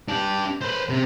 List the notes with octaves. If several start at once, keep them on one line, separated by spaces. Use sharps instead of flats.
D4 G4
B4 C5
C3